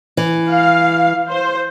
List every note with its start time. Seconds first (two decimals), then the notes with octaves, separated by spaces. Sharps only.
0.17 E3
0.51 F5
1.30 C5